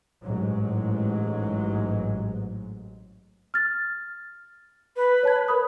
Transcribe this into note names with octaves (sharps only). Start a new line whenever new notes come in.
A1 G#2 F#3 G#3
F6 A6
B4
C#5 A5 G#6
A#4 B5 D#6